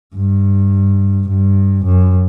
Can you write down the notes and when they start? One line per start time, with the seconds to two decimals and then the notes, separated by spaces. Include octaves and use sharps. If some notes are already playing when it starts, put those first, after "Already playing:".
0.16 G2
1.29 G2
1.85 F#2